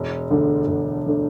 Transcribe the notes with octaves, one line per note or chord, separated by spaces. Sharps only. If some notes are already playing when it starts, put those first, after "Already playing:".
Already playing: E1
D2 D3 A3 D4
E1
D3 A3 D4